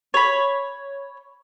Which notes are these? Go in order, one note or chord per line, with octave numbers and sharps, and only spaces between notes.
C#5 B5